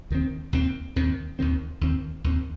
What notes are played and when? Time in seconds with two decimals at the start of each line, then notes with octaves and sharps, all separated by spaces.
0.10 D#2 D#3 C4
0.53 D#2 D#3 C4
0.96 D#2 D#3 C4
1.39 D#2 D#3 C4
1.81 D#2 D#3 C4
2.24 D#2 D#3 C4